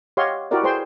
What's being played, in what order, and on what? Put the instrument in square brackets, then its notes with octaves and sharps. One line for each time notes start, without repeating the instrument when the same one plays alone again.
[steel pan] G4 C#5 D#5 F5 F#5 C6
E4 F#4 G4 A#4 D5 D#5
G#4 B4 C5 G5 C6